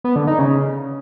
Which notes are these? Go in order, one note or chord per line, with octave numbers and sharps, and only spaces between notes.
B3
D3
D#4
C#3